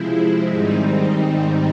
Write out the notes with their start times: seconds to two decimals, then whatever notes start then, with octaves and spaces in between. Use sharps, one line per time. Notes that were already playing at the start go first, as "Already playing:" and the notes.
Already playing: C3 F3 G#3 C4 E4
0.49 G#2 D#3 G3 C4 D#4